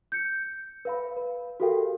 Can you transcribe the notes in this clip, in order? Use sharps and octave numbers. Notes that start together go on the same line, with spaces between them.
G6 C#7
B4 F5 B5
B4
F#4 G4 A4 A#4 F5 G5